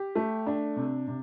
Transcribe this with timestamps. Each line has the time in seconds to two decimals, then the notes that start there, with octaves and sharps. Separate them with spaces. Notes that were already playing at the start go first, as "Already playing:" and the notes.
Already playing: G4
0.15 A3
0.46 D4
0.76 C3
1.07 C3